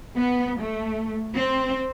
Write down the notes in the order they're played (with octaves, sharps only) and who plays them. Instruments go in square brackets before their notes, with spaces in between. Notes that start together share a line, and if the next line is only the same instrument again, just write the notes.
[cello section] B3
A3
C4